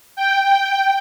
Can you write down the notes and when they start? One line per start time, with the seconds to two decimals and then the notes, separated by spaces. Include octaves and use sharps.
0.16 G5